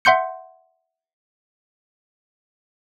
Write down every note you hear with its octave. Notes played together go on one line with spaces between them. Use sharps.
E5 F#5 C6 G6 C#7